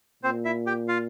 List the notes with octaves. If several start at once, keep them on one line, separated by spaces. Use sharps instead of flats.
A#2 C4 C5
E4 E5
G4 G5
F4 F5